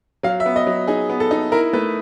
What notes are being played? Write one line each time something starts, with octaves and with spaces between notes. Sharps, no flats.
F#3 F5
E5
B3
D#5
F#3
D#4 G#4
B3
A4
D#4
E4 A#4
A3 B4